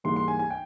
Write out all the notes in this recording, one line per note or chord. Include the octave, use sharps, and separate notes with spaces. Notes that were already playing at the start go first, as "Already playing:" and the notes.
G#2 E3 G3 A#3 C6
C6
G#5
G#5
G5